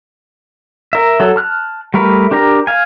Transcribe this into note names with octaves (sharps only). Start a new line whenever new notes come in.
A#4 E5
F#3 A4
A5 F6 F#6
G3 A3 A#4 B4
D4 G4 A#4 A#5
F5 G#5